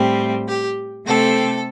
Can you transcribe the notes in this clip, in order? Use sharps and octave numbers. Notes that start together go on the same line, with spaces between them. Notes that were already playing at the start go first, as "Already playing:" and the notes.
Already playing: A2 G3 C4
G4
C3 A3 C4 A4